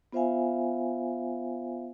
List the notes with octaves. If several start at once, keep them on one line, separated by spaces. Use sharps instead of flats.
B3 F4 C5 E5 F5 G#5